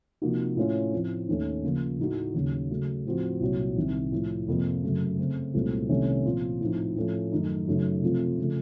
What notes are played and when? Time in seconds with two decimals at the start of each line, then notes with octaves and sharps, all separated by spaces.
0.22 C3 F3 A#3 D#4 F#4
0.56 A2 A3 C#4 F4
0.93 A2 F3 C4
1.28 D#2 D#3 A3 C#4
1.63 C#3 F3 A#3 F4
1.99 A2 A3 D#4 F#4
2.34 D#2 C#3 F#3
2.71 C#3 F#3 A3
3.06 A2 F3 C4 F#4
3.40 C2 A#2 F#3
3.76 C2 C3 D#3
4.12 A2 F3 A3
4.48 F2 C3 F3 A#3 F4
4.83 F#2 C#3 F#3 A3
5.19 C#3 A3 C4
5.54 C2 A#2 F#3 A3 C4
5.89 C2 C3 D#3 A3 C#4
6.25 A#2 F3 C4 F4
6.60 A2 F3 C4 D#4
6.96 A2 F3 A3 C#4
7.32 F#2 D#3 A3 D#4
7.67 F#2 C#3 F#3 A3 D#4
8.02 C3 F3 A3 C4 F4
8.39 C#3 F3 A3